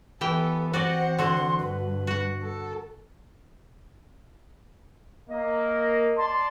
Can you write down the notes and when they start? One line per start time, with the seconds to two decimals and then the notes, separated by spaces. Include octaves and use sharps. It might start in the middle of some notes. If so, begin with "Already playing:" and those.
0.21 E3 B3 G4 A4 G5
0.73 E3 C4 F#4 C5 D5 D#5 F#5
1.18 D3 F#4 C6
1.58 G2 B4
2.07 F#4 F#5
2.42 A4
5.30 A#3 D#5
6.17 D5 A5 C6